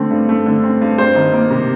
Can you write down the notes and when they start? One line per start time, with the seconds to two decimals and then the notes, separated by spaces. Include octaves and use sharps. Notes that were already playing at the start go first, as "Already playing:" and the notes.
Already playing: D3 A3 C4
0.10 G2
0.29 A3
0.46 D3
0.63 C4
0.82 G2
0.98 G3 C5
1.15 D#3
1.33 A#3
1.50 C3